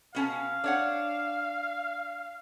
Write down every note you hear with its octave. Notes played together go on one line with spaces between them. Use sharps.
B2 C#4 F5 A5
D4 C#5 F#5